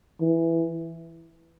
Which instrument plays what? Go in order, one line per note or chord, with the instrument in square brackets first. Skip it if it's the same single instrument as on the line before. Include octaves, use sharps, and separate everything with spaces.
[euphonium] E3